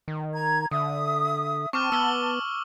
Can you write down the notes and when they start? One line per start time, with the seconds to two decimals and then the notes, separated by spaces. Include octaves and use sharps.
0.08 D#3
0.33 A#5 G#6
0.71 D3 E5 D#6
1.73 C4 A5 C#6 D6 F6
1.92 B3 E6 G7